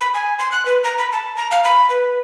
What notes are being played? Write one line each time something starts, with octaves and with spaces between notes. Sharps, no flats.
B5
G#5
C6
F#6
B4
A#5
B5
A5
A#5
F5
B5
B4